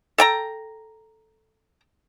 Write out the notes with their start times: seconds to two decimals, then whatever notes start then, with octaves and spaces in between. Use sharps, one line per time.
0.18 A4 G5 A#5